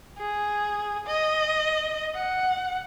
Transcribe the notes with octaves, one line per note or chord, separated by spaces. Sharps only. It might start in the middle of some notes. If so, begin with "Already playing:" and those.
G#4
D#5
F#5